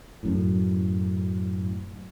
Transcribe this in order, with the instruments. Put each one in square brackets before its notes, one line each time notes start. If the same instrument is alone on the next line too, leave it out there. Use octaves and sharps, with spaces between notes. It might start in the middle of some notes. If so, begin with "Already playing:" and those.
[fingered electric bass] F#2 A2